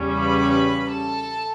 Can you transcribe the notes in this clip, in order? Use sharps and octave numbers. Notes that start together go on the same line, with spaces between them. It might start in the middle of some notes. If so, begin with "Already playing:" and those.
Already playing: E2 C#3 G3 C#4
B4 B5
A4 A5